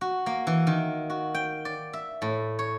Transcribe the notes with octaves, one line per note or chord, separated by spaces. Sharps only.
F#4
A#3
E3
D#3
F#4
G5
D5
E5
A2
C#5